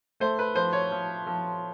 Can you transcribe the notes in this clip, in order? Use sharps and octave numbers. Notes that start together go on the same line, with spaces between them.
A3 C5
B4
F3 C5
C#5
F3
F3